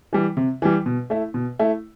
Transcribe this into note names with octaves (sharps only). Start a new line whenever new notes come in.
E3 G3
C3
E3 G3
B2
A3 E4
B2
A3 E4